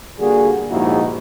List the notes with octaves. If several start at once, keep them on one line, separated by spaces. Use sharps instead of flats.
D3 G3 A#3 F#4 G#4
A#1 D#2 G#2 D#4 E4 F#4